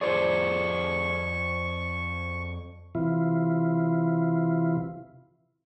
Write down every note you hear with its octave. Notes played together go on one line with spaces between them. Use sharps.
F2 F4 G#4 C5 D5 C#6
C3 E3 E4 F4